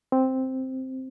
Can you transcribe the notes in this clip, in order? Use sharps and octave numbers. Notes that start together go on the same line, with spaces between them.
C4